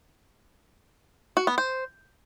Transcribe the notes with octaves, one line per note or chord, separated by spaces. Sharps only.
F#4
B3
C5